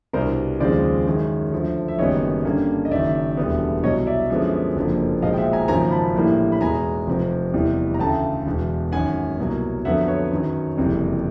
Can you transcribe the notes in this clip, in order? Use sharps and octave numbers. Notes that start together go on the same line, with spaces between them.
C2 B2 G3 B3 D4 A#4 C5
D#2 C#3 F3 G#3 C4 C5 D5
F#2 D#3 G#3 C#4
D2 D3 F3
E5
F#1 F#2 D#3 G3 B3 C#5 D#5
G2 D3 G3 A#3 C#4
D#5
F#1 F#2 D#3 D5 E5
E1 D2 D3 G3 B3
C2 B2 F#3 C#5 D#5
D5 E5
F#2 D3 F3 G#3 B3
F#1 F2 D3 F3 A#3
B1 A#2 F3 G#3 D#5 F5
G5
E5 F#5
G#5 A#5
G#1 F#2 C#3 F3 A#3 G#5 A#5
A5 B5
A#1 A2 E3 G3 A#3
B5
E2 B2 G#3 G#5 A#5
F1 F2 C3 F3
F1 E2 C3 E3 G3
A#5
D2 C#3 E3 A3 G5 A5
E1 E2 B2
G#1 F#2 D#3 F#5 G#5
C2 B2 F#3 A#3
F2 D3 F#3 B3 E5 F#5
B4 C#5
F#2 D#3 F#3
F#1 F2 C3 E3 G3